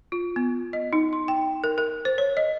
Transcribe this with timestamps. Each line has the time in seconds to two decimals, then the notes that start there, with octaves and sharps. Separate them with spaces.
0.12 F4
0.36 B3
0.73 D#5
0.93 D#4
1.13 C6
1.28 G5
1.64 A#4
1.78 A#4
2.05 C5
2.18 C#5
2.37 D#5